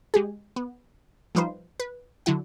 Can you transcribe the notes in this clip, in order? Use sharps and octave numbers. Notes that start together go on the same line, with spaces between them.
G#3 G4 G#4
B3
F3 G3 D#4 F4 B4 C5
B4
D3 F#3 E4 F#5